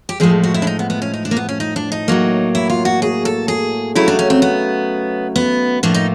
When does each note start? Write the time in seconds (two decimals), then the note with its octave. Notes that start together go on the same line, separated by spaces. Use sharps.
0.09 G4
0.20 A2 F3 G#3 G#4
0.43 F#4
0.54 E4
0.62 D4
0.67 D#4
0.79 B3
0.90 B3
1.02 C#4
1.14 D#4
1.25 D4
1.31 A#3
1.37 B3
1.49 C#4
1.60 D#4
1.76 D4
1.92 D#4
2.08 A2 F#3 A#3
2.55 E4
2.70 F4
2.85 F#4
3.02 G#4
3.25 A4
3.48 G#4
3.95 C#3 F#3 A3 E4
4.08 D4
4.19 C#4
4.30 C4
4.42 B3
5.36 B3
5.83 A2 F3 A#3 D4
5.94 D#4